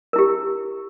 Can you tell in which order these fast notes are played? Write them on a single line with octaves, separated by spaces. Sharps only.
A#4 E4 G4